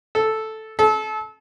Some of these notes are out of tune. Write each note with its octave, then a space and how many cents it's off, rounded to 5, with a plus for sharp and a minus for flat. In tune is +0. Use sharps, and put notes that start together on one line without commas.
A4 -5
A4 -30